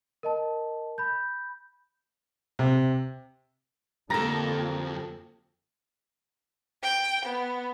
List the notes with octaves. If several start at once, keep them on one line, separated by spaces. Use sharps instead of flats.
A#4 D#5 A5
B5 G6
C3
F2 D3 A#3 G4 A4 A#5 A#6
G5
B3